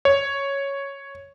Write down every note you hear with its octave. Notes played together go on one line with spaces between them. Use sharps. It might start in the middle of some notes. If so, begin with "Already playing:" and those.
C#5